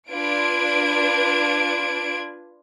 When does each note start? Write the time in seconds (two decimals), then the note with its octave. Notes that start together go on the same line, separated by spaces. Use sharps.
0.11 D4 F4 B4 G#6 D7